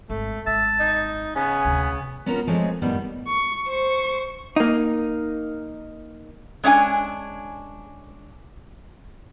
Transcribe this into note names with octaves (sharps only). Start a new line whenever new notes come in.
G#1 A3
G#1 E5 A5
D#4
C#3 B3 G#5
D2 C3
B3 C#4 F4 F#4 A#4
F3 G#3 A3 C4 C#5 D#5
F#2 A2 D#3 G3 B3
C#6
C5 C#6
A#3 D#4
G#3 C#4 D4 F#5 G#5